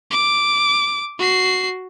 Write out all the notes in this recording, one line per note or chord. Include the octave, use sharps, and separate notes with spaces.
D6
F#4 C7